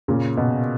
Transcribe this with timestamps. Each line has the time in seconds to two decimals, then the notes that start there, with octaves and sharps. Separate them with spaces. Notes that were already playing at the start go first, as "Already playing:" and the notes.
0.08 A#2 C#3
0.37 B2